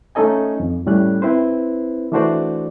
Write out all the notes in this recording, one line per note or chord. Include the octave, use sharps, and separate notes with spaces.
A3 C#4 D#4 A4 D#5 G#5
F2
A2 G3 C#4 F#6
C4 E4 B4 C5
E3 A3 D4 F#4 C5 D5